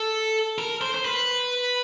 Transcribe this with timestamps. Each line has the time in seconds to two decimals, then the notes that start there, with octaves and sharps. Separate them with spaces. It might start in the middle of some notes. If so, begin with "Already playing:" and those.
Already playing: A4
0.58 A#4
0.81 C5
0.94 C5
1.05 B4